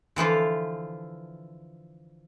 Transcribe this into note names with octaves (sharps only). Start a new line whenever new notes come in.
D3 E3 F3 F4